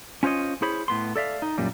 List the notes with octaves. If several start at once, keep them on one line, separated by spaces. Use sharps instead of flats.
C#4 F4 C5 C#5 D#5
E4 G#4 C5 C#5 B5
A2 B3 C6
A4 D5 E5 F5
D#4
F#2 A#2 G3